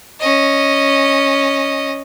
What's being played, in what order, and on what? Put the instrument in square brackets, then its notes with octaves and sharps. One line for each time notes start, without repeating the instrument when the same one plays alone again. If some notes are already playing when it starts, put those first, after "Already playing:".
[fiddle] C#4 D#5